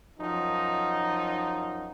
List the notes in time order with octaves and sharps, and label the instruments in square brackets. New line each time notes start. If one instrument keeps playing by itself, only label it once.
[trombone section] F#2 F3 D#4